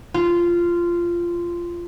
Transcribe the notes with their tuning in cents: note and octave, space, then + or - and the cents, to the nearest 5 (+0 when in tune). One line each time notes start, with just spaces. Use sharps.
F4 -15